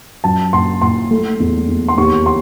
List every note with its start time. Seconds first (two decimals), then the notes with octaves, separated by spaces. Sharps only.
0.24 F#2 A5
0.53 F#1 C6
0.82 F#1 C6
1.10 A3
1.40 E2
1.69 E2
1.88 C6
1.97 D#2 C#6
2.26 C6